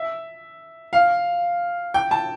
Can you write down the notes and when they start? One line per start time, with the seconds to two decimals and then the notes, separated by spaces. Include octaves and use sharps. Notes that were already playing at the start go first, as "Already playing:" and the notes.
Already playing: E5
0.93 F5
1.94 G5
2.11 A5